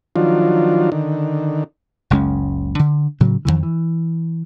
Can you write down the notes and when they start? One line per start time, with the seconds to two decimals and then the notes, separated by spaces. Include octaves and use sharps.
0.16 D#3 F3 F#3 D4 F4
0.92 D3 D#3
2.10 F#1 C#2 G#3 C#4
2.79 D3
3.20 A2 C#3 F#3
3.45 F2 C3 D#3 E3
3.63 E3